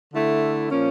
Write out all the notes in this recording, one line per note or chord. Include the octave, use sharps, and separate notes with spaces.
D3 A3 E4
A#2 F3 A#3 C#4